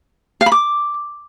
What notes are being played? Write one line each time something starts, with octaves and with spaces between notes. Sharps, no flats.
F5
B5
D6